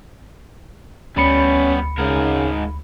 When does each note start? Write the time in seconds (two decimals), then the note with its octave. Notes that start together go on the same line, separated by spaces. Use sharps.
1.17 D2 G3 B3 C#4 B5 C#7
1.98 G#2 C#3 A#4